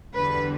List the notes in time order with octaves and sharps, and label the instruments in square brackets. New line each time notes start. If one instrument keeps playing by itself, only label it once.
[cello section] E2 D3 G3 B4